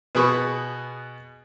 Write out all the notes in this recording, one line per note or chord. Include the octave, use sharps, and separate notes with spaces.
B2 B3 G#4 B5 C#6